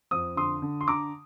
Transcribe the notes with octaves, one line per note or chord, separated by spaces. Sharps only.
F2 D#6
D3 C6 D#6
D3
C6
D3 A#5 D6